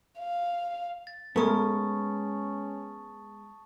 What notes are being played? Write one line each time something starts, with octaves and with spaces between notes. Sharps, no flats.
F5
A6
G#3 A3 B3 C#4 A#4 A5 C#6 D#6